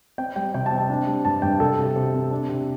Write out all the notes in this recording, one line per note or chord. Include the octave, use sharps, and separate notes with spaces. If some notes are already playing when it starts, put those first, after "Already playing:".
C4 G5
G3 G5
C3 G5
A5
C4
A5
D4
G3
G2 A5
G2 G5
C3 A4
C3
C3
C4
D4
C3